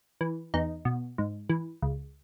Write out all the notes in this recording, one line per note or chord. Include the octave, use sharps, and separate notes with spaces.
E3
E2 D#4
B2
G#2
E3
C#2